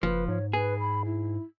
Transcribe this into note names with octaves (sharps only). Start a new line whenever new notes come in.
F#1 F3 B4
G#2 C#5
G#4 B4
B5
E4